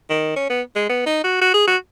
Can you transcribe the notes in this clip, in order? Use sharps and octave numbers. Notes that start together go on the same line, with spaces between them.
D#3
C#4
B3
G#3
B3
D#4
F#4
F#4
G#4
F#4